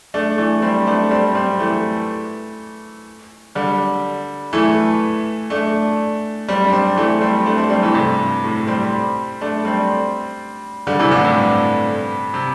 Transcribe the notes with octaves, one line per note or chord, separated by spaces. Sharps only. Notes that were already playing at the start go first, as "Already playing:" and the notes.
A3 D4
E3 A3
G3 C4
A3 D4
G3 C4
G3 C4
E3 A3
D3 G3
E3 A3
A3 D4
G3 C4
D4
G3 C4
E3 A3
G3 C4
A3 D4
G3 C4
G3 C4
E3 A3
G2 C3
A2
G3 C4
A3 D4
G3 C4
D3 G3
C3 E3
A2 D3
G2 C3
C3